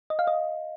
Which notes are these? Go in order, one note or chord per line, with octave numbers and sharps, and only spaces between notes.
D#5
F5
D#5